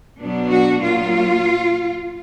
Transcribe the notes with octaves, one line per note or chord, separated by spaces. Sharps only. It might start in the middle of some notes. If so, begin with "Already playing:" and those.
B2 F#3 B3 D4
F#4
A#2 F#3 A#3 F4